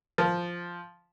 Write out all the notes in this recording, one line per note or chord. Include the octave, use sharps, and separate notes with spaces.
F3